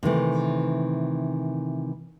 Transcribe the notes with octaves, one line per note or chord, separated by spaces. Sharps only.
C3 D#3 E3 A3